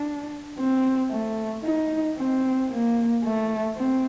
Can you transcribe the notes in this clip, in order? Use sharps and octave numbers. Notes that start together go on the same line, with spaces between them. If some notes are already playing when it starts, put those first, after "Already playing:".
Already playing: D4
C4
A3
D#4
C4
A#3
A3
C4